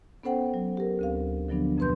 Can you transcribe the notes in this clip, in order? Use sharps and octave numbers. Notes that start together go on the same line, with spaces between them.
B3 C#4 A4 C5 F#5 G5
F#3
G4 A#4
D2 C4 F5
D3 F3 F#3 B3 D4
F2 B2 B4 C6 G6